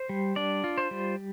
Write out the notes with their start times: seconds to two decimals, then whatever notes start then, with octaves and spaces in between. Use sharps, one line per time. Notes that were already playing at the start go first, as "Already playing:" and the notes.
Already playing: C5
0.09 G3
0.36 D4 D5
0.64 F4
0.78 C5
0.91 G3